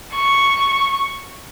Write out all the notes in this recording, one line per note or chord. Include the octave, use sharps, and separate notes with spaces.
C#6